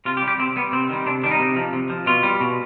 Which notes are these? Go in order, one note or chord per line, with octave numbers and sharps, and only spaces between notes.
C3 F4
G4
G3
G4
C3 C4
G3 B3
C3 C4
D#3 G3
C3 D4
D#3 G3 D4
D#4
C3
F3
C3
F3
B2 F4
G3
B2